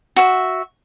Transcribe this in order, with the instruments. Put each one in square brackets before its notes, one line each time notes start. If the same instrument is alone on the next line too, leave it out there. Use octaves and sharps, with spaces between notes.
[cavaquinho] F#4 E5